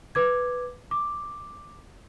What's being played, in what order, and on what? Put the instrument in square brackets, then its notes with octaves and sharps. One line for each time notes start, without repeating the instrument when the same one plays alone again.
[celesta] B4 D6 G#6
D6